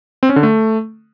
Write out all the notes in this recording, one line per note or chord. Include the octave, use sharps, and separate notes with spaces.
C4
C#4
D3
A3